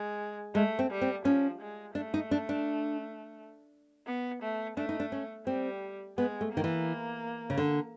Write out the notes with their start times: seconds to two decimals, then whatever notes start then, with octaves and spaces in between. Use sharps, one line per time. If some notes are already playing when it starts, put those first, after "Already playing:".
Already playing: G#3
0.55 G#3 A3
0.79 C4
0.91 G3
1.01 C4
1.25 F3 C#4
1.61 G#3
1.95 A3 D4
2.14 D#4
2.31 D4
2.49 D4
4.07 B3
4.42 A3
4.77 A3 D4
4.89 D#4
5.00 D4
5.12 C#4
5.47 G3 C4
6.18 G#3 B3
6.41 A3
6.52 D#3 A#3
6.64 E3
7.50 C#3
7.58 D3